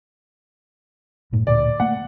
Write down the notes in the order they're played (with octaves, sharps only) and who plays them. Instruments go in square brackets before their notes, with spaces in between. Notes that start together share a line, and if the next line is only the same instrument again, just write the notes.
[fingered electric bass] F#2 A2
[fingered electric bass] D2 A#2 [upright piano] D5
[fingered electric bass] A3 A#3 [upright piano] F#5